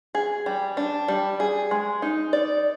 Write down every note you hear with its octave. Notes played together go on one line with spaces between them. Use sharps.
G#4
G3
D4
G3
G#4
G#3
D#4
D5